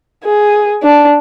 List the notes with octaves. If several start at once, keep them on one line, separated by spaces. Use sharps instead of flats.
G#4
D4